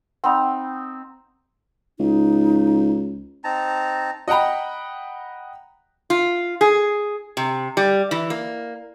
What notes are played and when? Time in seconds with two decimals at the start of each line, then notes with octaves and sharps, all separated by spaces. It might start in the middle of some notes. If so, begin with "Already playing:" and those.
0.24 C4 D#4 F#5 B5
1.99 C#2 D#4
3.44 C4 D#4 A5 A#5
4.28 D#5 F#5 G5 A#5 B5
6.10 F4
6.61 G#4
7.37 C3
7.77 G3
8.11 E3
8.30 A#3